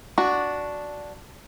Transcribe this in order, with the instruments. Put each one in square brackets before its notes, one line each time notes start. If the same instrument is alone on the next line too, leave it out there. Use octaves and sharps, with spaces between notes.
[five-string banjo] D4 F#4